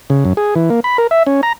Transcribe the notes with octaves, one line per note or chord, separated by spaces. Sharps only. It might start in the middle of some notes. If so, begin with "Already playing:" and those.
C#3
F#2
G#4
E3
A#3
B5
A#4
E5
C#4
A#5